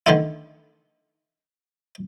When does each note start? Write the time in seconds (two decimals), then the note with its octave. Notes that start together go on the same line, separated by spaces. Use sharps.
0.06 D3 D#3 A3 D#4 E4